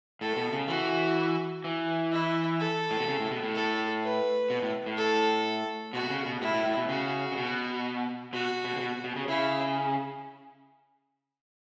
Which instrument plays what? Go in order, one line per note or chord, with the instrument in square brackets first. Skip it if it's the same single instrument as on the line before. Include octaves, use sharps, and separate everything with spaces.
[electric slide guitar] A2 [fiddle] A4
[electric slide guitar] B2
C#3
[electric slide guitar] E3 [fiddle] F#4
[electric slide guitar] E3
[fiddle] E4
A4
[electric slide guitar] A2
B2
C#3
A2
B2
A2
[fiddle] A4
B4
[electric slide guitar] B2
A2
A2
[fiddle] A4
[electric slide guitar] B2 [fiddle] F#4
[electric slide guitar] B2
C#3
B2
[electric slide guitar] A2 [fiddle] E4
[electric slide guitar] A2
A2
B2
[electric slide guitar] C#3 [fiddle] F#4
[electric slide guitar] C#3
B2
[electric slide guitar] B2 [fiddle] F#4
[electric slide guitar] B2
C#3
B2
B2
C#3
[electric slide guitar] C#3 [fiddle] E4